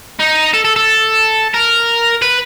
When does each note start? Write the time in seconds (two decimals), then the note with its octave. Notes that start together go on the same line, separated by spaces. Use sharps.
0.20 D#4
0.54 A4
0.65 A4
0.76 A4
1.54 A#4
2.22 B4